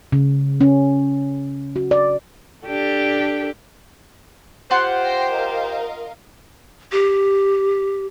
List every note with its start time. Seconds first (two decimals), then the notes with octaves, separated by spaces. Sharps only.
0.12 C#3
0.61 C#4
1.76 F#4
1.91 D5
2.66 D4 G4 A4
4.71 F4 G4 C5 F#5 C6
5.04 G5 A#6 C7
5.33 A#4 D#5 F5
6.92 G4